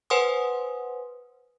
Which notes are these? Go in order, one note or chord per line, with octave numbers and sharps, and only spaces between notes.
B4 C5 F#5 G#5 C6 D#6